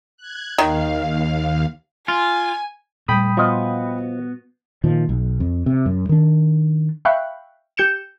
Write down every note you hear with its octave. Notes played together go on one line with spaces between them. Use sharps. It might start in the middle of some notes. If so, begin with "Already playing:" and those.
F#6 G#6
D#2 D#3 F5
F4 G#5
F2 A#2 G3 A3 G5 B5 D#6
F3 B3 F#4 D#5
A#2 D#3 F3
B1
F2
C3
F#2
D#3 D4
E5 F5 G5 B5 C#6 F#6
G4 G6 C#7 E7